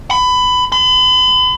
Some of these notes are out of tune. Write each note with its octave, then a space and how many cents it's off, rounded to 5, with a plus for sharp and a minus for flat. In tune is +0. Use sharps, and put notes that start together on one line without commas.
B5 +20
B5 +40